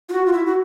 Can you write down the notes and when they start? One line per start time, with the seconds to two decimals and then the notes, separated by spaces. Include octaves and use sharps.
0.09 F4
0.13 F#4
0.26 F4
0.33 E4
0.46 F#4